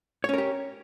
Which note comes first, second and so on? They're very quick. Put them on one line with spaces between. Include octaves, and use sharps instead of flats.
C#5 C#4 A#4 G4